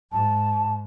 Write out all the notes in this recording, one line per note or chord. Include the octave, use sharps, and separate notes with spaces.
G#2 A5